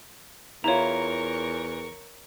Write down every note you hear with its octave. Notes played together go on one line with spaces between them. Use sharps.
E2 E4 F4 A#4 C#5 A#5 C#6